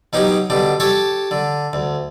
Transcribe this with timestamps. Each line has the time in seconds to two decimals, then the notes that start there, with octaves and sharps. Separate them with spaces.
0.13 B2 F#3 D#4 G4
0.50 B2 D3 G4
0.80 G4 A4 C#5
1.31 D3
1.73 D2